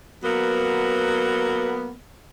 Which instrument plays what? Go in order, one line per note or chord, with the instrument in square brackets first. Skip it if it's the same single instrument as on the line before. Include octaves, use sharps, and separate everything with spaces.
[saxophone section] F#3 A#3 B3